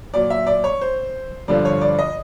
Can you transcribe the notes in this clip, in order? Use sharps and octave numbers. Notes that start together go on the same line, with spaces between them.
A#2 F#3 D5
E5
D5
C#5
C5
G2 D3 F3 D5
C#5
D5
D#5